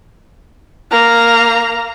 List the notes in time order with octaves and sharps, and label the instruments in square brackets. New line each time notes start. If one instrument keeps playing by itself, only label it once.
[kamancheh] A#3 A#5